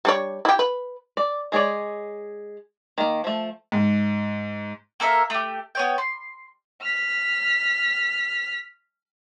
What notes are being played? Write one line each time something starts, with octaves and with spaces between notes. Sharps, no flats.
G3 D4 C#5
E4 G4
B4
D5
G#3 G#4 C#5 D5
D#3 A#3
F3 A3
G#2
A#3 A4 A#4 E5
A3 G4
B3 C#5 G5
C6
F6 B6